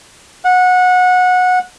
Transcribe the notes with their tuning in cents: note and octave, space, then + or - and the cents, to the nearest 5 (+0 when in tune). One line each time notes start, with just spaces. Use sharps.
F#5 -20